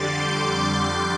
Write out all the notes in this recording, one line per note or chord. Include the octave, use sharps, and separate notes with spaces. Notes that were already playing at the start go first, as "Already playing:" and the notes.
Already playing: F2 D3 G3 C6 D6 A6
G6
A6